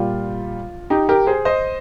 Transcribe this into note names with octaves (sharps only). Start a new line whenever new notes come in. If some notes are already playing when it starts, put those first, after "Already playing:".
Already playing: A#2 G3 F4
D#4 G4
G4 A#4
G#4 C5
C5 D#5